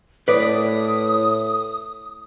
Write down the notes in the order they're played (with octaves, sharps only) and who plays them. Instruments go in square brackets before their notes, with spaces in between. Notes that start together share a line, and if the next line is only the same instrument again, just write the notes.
[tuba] A2 [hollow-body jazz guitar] B4 D5 [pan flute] D#6